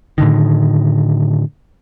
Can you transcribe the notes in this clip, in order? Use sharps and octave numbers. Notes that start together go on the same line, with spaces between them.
A2 D3 D#3